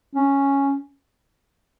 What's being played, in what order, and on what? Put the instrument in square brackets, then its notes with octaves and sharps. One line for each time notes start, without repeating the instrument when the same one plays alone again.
[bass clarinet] C#4